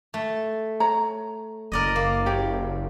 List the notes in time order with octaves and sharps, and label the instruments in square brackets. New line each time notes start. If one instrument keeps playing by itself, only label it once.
[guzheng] A3
[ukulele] C#5 A#5
[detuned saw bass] F#1 [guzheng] A#4 D5 D#5
[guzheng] A#3
[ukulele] G4 C#5